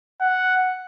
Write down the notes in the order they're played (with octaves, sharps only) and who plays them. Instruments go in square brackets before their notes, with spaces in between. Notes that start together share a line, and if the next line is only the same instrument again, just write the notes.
[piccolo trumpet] F#5